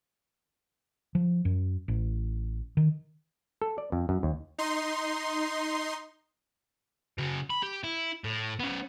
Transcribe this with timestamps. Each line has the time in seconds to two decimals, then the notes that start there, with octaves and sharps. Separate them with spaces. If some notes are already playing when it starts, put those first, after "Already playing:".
1.15 F3
1.45 F#2
1.88 A1
2.77 D#3
3.62 A4
3.78 D5
3.92 F2
4.09 F#2
4.23 D#2
4.58 D#4 C6
7.18 C#3 F#4
7.50 B5
7.63 G4
7.84 E4
8.24 A2
8.60 B3 C#4